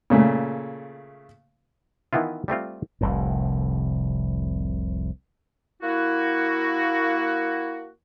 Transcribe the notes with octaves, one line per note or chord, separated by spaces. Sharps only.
A#2 C#3 A3
D#3 E3 B3 E4 F4
G3 A3 C4 F4
F1 C2 A2
A#3 E4 F#4